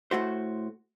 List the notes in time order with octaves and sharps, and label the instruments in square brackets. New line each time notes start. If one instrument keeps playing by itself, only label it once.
[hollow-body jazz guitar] A2 A3 F#4 C5